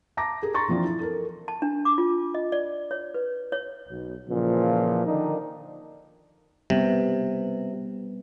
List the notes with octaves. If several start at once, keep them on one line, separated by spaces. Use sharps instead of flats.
A5 A#5 D6 A#6
G4 G#4 A#4
A#5 C6 C#6 A6
E3 F3 C4 D4 F4
E4
A4 A#4
A5
D4
D6
F4
D#5
D5
C#5
B4
C#5
B1
A#2 C#3 E3 F3
D3 D#3 F3 D4 D#4
C3 G3 B3